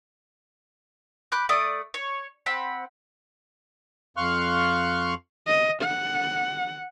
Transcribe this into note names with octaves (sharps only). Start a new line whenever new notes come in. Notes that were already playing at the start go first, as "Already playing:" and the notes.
B5 D6 F#6 G6
A3 D5 D#6
C#5
C4 F#5 B5
F2 F5 C6 C#6 F6 F#6
D#5
F#5